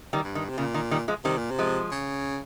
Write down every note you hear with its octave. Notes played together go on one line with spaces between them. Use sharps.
D#3 G3
G2
D#3
C3
A#2 C#3
D#3
D#3 G3
F3 G#3
C3 D#3 G3
A#2
C3
F3 G#3
C#3